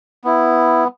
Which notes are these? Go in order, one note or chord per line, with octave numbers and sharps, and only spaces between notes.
B3 E4